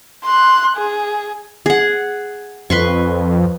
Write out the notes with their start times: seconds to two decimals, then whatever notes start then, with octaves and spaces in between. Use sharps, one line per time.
0.25 C6 F#6
0.77 G#4
1.66 G#4 F#5
2.70 F2 B4 C6 C#6